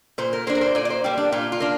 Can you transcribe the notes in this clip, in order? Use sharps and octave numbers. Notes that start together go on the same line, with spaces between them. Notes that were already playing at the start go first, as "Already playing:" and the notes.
A#2 C5
A#4
A#3 D4 C5
A#4
C5
A#2 D5
D5
C5
G3 A#3 G4
D4
A#2 F4
F4
A#3 D4